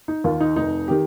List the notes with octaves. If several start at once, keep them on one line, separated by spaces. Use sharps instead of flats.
D#4
D#2 D#3 F4
D#4
F1 D#4
D#3 G4